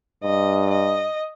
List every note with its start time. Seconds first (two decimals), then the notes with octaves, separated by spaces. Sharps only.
0.24 G2 D#5
0.70 D#5